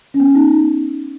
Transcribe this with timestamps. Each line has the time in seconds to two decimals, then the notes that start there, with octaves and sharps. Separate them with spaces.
0.14 C#4
0.20 B3
0.35 D#4